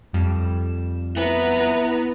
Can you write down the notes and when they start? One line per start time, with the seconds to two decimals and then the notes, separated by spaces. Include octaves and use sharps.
0.13 F2 G3 E7
1.16 B3 E4 B4 A#5